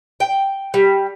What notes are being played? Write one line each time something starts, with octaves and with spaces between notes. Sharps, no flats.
G5
G3